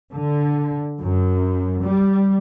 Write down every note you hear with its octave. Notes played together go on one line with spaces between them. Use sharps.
D3
F#2
G3